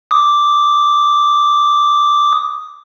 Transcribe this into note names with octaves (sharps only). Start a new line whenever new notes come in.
D6 D#6